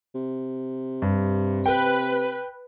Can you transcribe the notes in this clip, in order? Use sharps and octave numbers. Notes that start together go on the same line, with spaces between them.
C3
G2
B4 G5